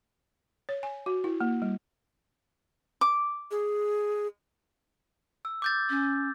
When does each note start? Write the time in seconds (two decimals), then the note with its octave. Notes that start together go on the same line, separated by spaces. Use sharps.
0.69 C#5
0.83 G#5
1.06 F#4
1.24 E4
1.41 A#3
1.62 G3
3.01 D6
3.51 G#4
5.45 E6
5.62 D6 G6 A6
5.89 C#4